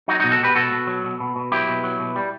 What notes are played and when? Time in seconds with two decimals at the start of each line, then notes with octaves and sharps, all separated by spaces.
0.08 F#3 D#4 F#4
0.20 D#4 F#4
0.24 B2
0.31 F#4 A4
0.40 B2 G4 B4
0.55 B2 F#4 A4
0.72 B2
0.87 F#3
1.04 B2
1.20 B2
1.36 B2
1.52 F#3 E4 G4
1.68 B2
1.84 F#3
2.00 B2
2.16 G3